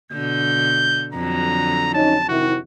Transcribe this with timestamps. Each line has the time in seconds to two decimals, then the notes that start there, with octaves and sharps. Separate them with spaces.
0.12 B2 D3 G6
1.13 F2 D3 F#3 A#5
1.94 C#4 D#4 A5
2.29 C3 D#3 E4 F#4